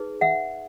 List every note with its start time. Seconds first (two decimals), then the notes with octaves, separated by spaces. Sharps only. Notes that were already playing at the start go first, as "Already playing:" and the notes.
Already playing: D#4 G#4 B4
0.21 E5 F#5